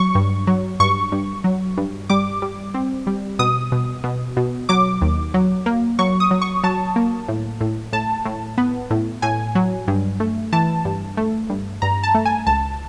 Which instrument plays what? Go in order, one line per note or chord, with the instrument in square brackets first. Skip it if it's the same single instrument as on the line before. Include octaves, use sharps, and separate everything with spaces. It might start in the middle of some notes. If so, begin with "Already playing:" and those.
Already playing: [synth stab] F#3 C#6
G2
F#3
G2 C#6
G2
F#3
G2
G3 D6
G3
C4
G3
B2 D#6
B2
B2
B2
F#3 D6
D#2
F#3
A#3
F#3 C#6
D#6
F#3
C#6
F#3 A5
A#3
A2
A2
A2 A5
A2
B3
A2
A2 G#5
F#3
G2
A3
E3 A5
G2
A3
G2
G2 A#5
A5
A3
G#5
C#2 A5